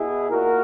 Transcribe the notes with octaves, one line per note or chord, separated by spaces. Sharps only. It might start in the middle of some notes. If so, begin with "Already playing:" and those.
Already playing: B2 E4 G#4
A#2 F#4 A#4